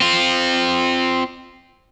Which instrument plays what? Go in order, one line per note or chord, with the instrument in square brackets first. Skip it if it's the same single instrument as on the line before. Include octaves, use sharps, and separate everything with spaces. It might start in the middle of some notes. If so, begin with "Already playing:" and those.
[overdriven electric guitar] C4 F4